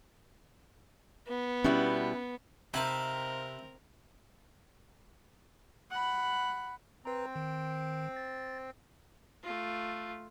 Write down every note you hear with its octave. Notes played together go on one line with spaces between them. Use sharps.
B3
B2 G3 C#4 E4
C3 C4 D#4 A#4 E5 F5 A5 B5
F#5 B5
C4 B4 A#5
D#3
A6
A3 F4